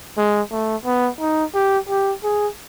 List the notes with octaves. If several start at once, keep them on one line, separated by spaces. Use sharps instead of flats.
G#3
A3
B3
D#4
G4
G4
G#4